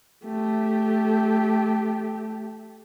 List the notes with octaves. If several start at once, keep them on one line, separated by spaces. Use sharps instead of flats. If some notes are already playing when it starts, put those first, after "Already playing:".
A3 G4